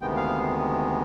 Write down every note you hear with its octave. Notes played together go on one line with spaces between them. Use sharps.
D2 C3 D#3 G#3 B3 G5
F5